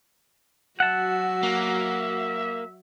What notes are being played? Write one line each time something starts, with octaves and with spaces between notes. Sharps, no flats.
F#3 F#4 E5 F#5 A5
A#3